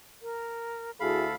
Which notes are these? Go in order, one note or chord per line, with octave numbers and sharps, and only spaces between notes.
A#4
D2 E4 F#4 G#4 A4 F5 B5